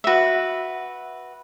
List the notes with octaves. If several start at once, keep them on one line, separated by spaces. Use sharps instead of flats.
F#4 B4 E5